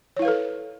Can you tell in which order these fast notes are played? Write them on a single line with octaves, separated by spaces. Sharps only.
C#5 E4 F5 B4 A4